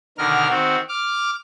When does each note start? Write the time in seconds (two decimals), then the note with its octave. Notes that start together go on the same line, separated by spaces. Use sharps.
0.18 B2 D3 D#3 A#4 F6
0.50 D#3 C4 F#4
0.89 D6 F6